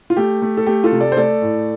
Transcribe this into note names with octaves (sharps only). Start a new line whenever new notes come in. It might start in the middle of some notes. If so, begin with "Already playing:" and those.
F4
A3 G4
A3
A4
A3 G4
F4 A4
C3
A4 D5
C5
A3 A4 D5
A2